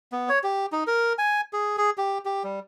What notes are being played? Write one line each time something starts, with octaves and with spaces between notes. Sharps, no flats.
B3
C#5
G4
D#4
A#4
G#5
G#4
G#4
G4
G4
G3